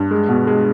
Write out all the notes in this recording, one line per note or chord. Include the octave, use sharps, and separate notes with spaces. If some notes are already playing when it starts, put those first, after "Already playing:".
Already playing: G2
G#3
B2
G#3